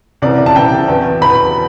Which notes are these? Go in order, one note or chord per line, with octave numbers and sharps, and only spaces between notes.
C2 C3 E3 D5
A5
C2 C3 E3 G5
E2 B2
E2 B2 B5